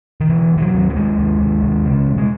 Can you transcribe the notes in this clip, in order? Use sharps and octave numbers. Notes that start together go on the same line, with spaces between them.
D#3
E1 E3
E1
E3
F#3
D#2
F#3
D#2 G#3
D#2
D#2
D#2
C#3
E1
G#3